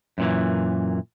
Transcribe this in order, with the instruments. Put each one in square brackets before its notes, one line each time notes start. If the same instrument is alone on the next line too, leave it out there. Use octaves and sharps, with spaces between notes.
[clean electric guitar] F#2 A#2 E3